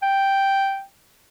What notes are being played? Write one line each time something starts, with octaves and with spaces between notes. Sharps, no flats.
G5